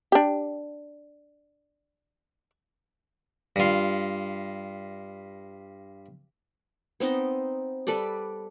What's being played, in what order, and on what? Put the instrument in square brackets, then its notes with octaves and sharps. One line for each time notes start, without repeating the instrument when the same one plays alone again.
[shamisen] D4 G4
[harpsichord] G2 F4
[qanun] B3 C4 D#4 D#5
G3 A4 B4 D5